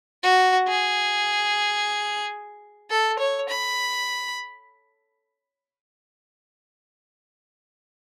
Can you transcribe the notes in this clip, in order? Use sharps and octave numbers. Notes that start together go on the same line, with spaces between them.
F#4
G#4
A4
C#5
B5